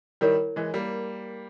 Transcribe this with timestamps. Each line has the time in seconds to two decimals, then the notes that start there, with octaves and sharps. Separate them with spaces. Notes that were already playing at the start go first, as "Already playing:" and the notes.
0.21 D#3 G3 E4 A#4 C#5
0.56 E3 G#3
0.74 G3 A#3